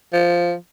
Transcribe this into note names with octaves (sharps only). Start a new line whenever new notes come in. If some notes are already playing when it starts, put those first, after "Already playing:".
F3